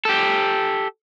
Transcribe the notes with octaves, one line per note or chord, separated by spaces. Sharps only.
G4 A4